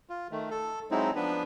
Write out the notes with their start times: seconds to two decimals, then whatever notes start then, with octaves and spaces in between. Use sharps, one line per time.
0.09 F4
0.31 D#3 A3
0.51 A4
0.91 F#3 G#3 C4 D#4 E4
1.15 F3 B3 D4 B4